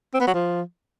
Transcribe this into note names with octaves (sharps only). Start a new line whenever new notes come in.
C4
B3
F#3
F3